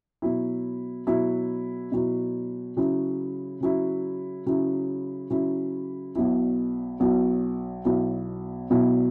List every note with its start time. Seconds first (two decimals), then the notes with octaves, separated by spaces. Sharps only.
0.22 B2 F#3 E4
1.07 B2 F#3 E4
1.92 B2 F#3 E4
2.77 C#3 F#3 E4
3.61 C#3 F#3 E4
4.46 C#3 F#3 E4
5.30 C#3 F#3 E4
6.15 B1 B2 F#3 E4
7.00 B1 B2 F#3 E4
7.85 B1 B2 F#3 E4
8.70 B1 B2 F#3 E4